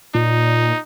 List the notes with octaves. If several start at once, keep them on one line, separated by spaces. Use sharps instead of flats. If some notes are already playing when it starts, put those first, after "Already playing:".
A#2 D#4